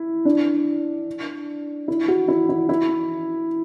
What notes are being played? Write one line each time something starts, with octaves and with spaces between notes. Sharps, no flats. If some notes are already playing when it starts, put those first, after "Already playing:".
Already playing: E4
D4
E4
F#4
E4
E4
E4